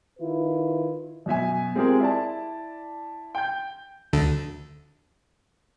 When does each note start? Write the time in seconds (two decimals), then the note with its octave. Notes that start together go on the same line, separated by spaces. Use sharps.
0.19 D#3 E4 F4 B4
1.26 F#2 B2 E5 G#5
1.75 G#3 C4 F4 G4 G#4 A#4
2.00 E4 D5 A5
3.35 G5 G6
4.13 D2 D3